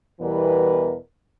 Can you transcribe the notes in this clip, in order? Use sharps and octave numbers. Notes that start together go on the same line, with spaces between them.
E2 B2 E3 G3 A#4 B4